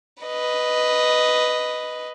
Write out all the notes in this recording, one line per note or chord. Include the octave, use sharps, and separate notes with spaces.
B4 D#5